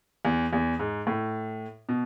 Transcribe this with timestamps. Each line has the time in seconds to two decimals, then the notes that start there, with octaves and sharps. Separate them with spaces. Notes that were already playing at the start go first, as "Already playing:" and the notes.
0.25 E2
0.53 E2
0.79 G#2
1.07 A2
1.89 B2